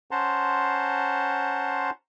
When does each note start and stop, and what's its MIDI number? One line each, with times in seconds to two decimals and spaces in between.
0.11 1.90 61
0.11 1.90 72
0.11 1.90 78
0.11 1.90 81
0.11 1.90 82
0.11 1.90 84